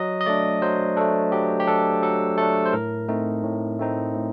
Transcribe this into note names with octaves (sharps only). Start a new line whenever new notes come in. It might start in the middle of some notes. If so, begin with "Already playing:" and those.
Already playing: F#3 D#5
D#5
A3 D4 D5
F#3 C5
A3 D4 A4
F#3 G4
G4
A3 D4 A4
F#3 A4
A3 D4 A4
C5
A2 A#4
A3 C4 D#4
A2
A3 C4 D#4
A2